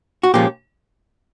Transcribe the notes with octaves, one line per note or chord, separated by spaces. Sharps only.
F#4
A#2 F3 G#3 C#4 G4